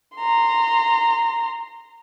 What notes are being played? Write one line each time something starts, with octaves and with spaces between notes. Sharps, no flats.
A#5 C6